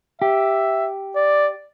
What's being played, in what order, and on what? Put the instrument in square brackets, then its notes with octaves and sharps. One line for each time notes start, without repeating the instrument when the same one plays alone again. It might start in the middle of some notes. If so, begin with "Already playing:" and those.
[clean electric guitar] G4 [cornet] E5
[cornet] D5